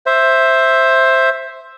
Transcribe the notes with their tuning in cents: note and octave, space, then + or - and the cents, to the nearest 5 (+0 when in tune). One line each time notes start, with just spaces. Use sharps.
C5 +10 E5 +0